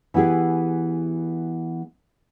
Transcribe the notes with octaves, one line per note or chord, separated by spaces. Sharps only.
E3 B3 E4 G4 G#4